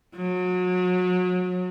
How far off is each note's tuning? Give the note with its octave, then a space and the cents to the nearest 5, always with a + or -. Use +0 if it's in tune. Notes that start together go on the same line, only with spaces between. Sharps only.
F#3 -30